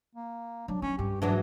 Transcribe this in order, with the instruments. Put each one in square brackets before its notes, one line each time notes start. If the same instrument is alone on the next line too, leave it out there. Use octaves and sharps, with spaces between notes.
[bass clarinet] A#3
[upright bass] F#3 [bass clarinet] D4
[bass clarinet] C#4 [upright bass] D#4
[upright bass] G2 [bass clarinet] G4
[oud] G#2 E3 F#3 [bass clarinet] D4